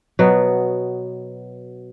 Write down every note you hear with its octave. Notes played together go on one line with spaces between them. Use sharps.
B2 F#3 B3